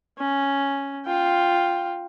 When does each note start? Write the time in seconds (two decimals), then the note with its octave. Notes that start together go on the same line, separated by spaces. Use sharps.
0.18 C#4
1.06 F4 G5